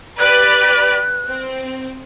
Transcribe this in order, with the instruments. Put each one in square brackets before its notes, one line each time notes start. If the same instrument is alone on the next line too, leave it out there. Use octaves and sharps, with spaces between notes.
[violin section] G4 B4 D5 [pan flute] F#6
[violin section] C4